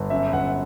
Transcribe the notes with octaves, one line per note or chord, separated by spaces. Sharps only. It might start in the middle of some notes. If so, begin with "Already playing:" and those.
Already playing: G1
F#2 E5
G1 F#5